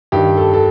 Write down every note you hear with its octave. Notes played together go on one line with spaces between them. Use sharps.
G2 D#3 G4
A4
A4